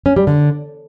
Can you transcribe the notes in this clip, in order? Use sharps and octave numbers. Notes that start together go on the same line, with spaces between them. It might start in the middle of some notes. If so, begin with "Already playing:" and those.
C#4
G3
D3